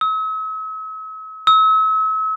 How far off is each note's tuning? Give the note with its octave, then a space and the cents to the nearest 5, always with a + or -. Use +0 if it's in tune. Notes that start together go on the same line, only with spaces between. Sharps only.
E6 -45
E6 -40